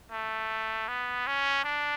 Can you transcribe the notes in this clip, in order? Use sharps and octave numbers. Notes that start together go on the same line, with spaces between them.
A3
B3
C#4
D4